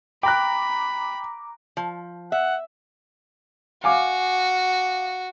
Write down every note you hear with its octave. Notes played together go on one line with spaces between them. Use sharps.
G5 A#5 B5 D6 F#6
F3
E5 F#5
F#4 F5 G#5 D6